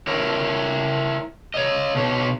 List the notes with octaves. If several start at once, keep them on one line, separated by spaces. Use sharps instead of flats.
E4 A#4 C#5
C#5 D#5
B2 C#5